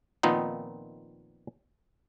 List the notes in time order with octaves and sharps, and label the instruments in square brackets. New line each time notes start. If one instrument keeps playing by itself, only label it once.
[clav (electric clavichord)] A#2 D#3 F3 B3 C4 D#4